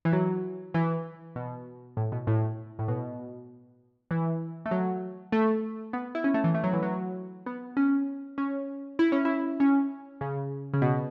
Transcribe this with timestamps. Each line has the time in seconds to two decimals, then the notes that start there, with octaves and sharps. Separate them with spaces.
0.05 E3
0.13 F#3
0.74 E3
1.36 B2
1.97 A2
2.12 B2
2.27 A2
2.79 A2
2.88 B2
4.11 E3
4.66 A3
4.71 F#3
5.32 A3
5.93 B3
6.15 E4
6.24 C#4
6.34 A3
6.44 E3
6.54 A3
6.64 F#3
6.73 E3
6.83 F#3
7.46 B3
7.77 C#4
8.38 C#4
8.99 E4
9.12 C#4
9.25 E4
9.60 C#4
10.21 C#3
10.74 C#3
10.82 B2